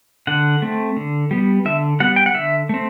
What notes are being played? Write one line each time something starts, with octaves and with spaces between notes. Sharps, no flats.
D3 F#5
A3 C4
D3
G3 B3
D3 E5
G3 B3 F#5
G5
F#5
D3 E5
A3 C4